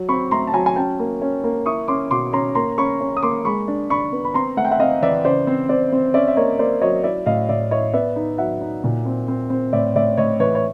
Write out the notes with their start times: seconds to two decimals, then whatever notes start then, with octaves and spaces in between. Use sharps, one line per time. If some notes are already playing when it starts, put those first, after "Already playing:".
Already playing: F#3
0.09 C4 B5 C#6
0.31 A3 A#5 C6
0.47 A5
0.53 F#3 G#5 A#5
0.66 G#5
0.76 C#4 G5 A5
0.99 A#3
1.22 C#4
1.44 A#3
1.66 E4 C#6 D#6
1.88 C#4 C6 D6
2.10 B2 C6 D6
2.33 C#4 A#5 C6
2.55 A#3 A#5 C6
2.78 C#4 B5 C#6
3.01 C#4
3.17 D#6
3.22 A#3 C6 D6
3.45 G#3 B5 C#6
3.68 D4
3.90 D4 B5 C#6
4.12 B3
4.25 B5
4.34 C4 A#5 C6
4.57 A3 F#5
4.65 G5
4.71 E5 F#5
4.79 C4 D#5 F5
5.02 E3 D5 E5
5.25 C#3 C5 D5
5.47 C4
5.69 C4 C5 D5
5.92 C4
6.14 C#4 D5 E5
6.28 E5
6.37 A#3 C#5 D#5
6.59 A#3 C5 D5
6.82 F#3 C#5 D#5
7.04 E4 D5 E5
7.26 A2 D#5 F5
7.49 A2 D5 E5
7.71 E4 C#5 D#5
7.93 B3 D5 E5
8.16 D#4
8.38 F#3 E5 F#5
8.61 D#4
8.84 A#2
9.05 C4
9.28 C4
9.50 C4
9.73 A2 D5 E5
9.95 A2 D5 E5
10.17 A2 C#5 D#5
10.40 E3 B4 C#5
10.55 C#5